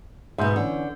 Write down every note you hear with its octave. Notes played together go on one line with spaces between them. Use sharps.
G#2 B2 E5 C6 G6
D3 E3 C#4